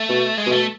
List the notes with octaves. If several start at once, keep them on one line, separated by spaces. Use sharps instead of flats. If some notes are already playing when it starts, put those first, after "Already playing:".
Already playing: A3
B2
G#3
B2
A3